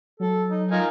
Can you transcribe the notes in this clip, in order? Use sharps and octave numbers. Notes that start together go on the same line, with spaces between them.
F#3 A4
D#4
D#4 F4 A#4 G#5